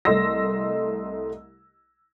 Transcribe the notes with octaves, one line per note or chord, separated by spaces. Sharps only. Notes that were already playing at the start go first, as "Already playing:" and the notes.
C2 A3 D#5 C6 E6 A#6